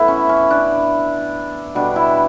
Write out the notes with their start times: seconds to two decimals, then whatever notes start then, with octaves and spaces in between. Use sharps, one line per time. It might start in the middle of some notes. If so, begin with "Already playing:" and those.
Already playing: A2 E3 B3 E4
0.08 C#4
0.29 C#4
0.50 D4
1.75 B2 G3 B3 D4
1.96 E4